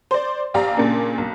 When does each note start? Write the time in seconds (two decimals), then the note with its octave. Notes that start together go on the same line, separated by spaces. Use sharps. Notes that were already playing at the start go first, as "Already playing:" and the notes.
0.11 C5 D5
0.54 A#1 G4 D5 F5 A#5
0.77 A#2 C#3 A#3 D4
1.18 B1